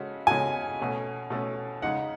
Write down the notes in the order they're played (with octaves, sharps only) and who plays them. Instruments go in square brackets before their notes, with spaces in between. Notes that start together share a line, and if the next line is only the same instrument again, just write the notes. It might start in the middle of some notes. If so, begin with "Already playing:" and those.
Already playing: [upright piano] C#3 G#3 C#4 F#4 A4
[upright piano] C#3 G#3 C#4 F#4 A4 [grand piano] G#5
[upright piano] B2 A3 C#4
B2 A3 C#4
[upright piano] C#3 G#3 D#4 [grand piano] F#5